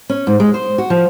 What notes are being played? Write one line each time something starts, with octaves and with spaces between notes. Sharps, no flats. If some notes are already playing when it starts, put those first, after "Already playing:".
C#4
G#2
G#3
C5
F#4
F3